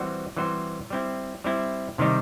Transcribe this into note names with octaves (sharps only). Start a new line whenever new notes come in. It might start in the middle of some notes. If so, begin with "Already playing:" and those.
Already playing: E3 G3 C4 F#4 C5
E3 G3 C4 F#4 C5
G3 C4 E4
G3 C4 E4
C3 D#3 G3 D#4